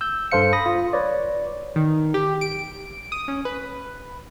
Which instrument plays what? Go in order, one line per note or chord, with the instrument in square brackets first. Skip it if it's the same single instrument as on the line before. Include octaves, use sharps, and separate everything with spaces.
[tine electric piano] E6 G6
G2 A4 C5 F5 C#7
B5 D#6 A#6
F4
B4 C#5 D5
[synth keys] D#3
G4
D7
D#6
C#4
B4